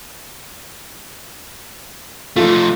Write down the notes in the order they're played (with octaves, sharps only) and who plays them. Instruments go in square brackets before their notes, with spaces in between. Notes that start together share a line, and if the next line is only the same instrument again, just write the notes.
[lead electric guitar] F3 A3 [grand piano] F4 A4 F5